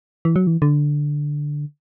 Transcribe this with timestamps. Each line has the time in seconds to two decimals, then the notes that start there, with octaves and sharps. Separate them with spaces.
0.25 E3
0.36 F#3
0.47 E3
0.62 D3